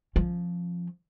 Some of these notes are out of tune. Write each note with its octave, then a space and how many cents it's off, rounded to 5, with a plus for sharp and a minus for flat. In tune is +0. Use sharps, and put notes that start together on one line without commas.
F3 +0 C#4 -35